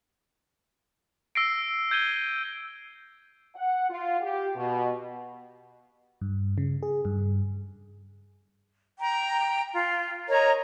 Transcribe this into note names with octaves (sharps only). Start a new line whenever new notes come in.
E6 A#6 C7 D7
G6 G#6 D#7 G7
F#5
F4
G4
B2
G2
C#3
G#4
G2
G5 A#5
F4
A#4 C#5 D#5 A#5